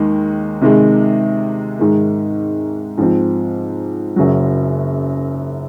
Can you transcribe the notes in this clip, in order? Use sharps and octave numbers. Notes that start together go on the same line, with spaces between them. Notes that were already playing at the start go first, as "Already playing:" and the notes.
Already playing: D#2 D#3 G#3
C3 D#3 G#3
G#2 D#3 G#3
G#2 F3 C4
F#1 F#2 C#3 F#3